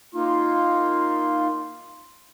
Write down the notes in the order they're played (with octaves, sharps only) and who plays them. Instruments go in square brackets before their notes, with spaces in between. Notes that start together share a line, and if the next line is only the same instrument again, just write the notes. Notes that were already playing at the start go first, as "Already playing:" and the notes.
[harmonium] A#3 D#4 F4 [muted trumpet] C6